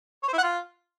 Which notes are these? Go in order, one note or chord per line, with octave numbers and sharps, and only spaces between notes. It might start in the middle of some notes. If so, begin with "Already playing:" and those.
C#5
C5
E4
F#5
F4